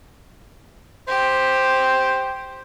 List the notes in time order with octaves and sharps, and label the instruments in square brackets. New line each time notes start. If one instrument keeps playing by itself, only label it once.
[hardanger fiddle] G4 [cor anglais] C5